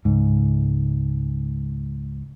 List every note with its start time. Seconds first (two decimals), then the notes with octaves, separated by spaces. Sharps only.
0.05 C#2 G#2